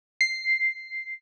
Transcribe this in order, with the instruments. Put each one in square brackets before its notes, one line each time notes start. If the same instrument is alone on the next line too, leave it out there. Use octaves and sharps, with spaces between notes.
[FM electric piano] C7